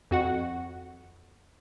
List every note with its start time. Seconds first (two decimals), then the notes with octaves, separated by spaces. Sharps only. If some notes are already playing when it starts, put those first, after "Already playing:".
0.11 F2 F#4 F#5